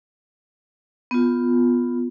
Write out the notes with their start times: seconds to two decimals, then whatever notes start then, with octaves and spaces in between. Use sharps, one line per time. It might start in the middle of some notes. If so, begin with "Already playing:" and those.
1.11 B3 F4